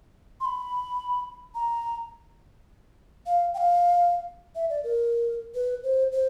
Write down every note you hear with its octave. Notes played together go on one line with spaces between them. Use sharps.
C6
B5
A#5
F5
G5
F5
E5
D5
A#4
B4
C5
C5